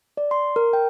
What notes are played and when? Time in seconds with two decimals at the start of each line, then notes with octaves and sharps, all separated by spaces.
0.17 D5
0.31 C6
0.56 A#4
0.73 G5